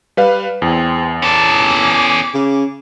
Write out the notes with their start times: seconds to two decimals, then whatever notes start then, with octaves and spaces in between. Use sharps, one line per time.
0.17 G3 B4 F5
0.62 E2 C4 G#4
1.22 C#4 A4 G#5 D6
2.34 C#3